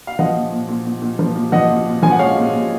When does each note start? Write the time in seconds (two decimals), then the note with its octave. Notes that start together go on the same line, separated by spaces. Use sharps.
0.07 F5
0.19 F3 D#5 F#5
0.36 A#2
0.52 A#2
0.68 A#2
0.85 A#2
1.02 A#2
1.19 F3
1.35 A#2
1.52 F3 D#5 F#5
1.70 A#2
1.86 A#2
2.03 F3 G#5
2.11 F#5
2.19 G#3 C#5 F5
2.36 A#2
2.53 A#2